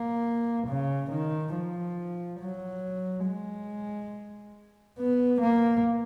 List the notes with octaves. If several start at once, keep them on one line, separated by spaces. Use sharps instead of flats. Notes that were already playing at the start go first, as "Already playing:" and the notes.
Already playing: A#3
C#3
D#3
F3
F#3
G#3
B3
A#3